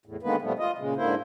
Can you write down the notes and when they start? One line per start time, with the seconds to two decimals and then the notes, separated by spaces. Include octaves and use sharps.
0.06 E2 A2
0.23 D3 D#3 G#3 A#3 B3 B4
0.42 A#2 F3 G3 A3 B3
0.59 F4 D#5
0.78 A#2 C#3 G#3
0.96 G#2 D3 A#3 E4 C5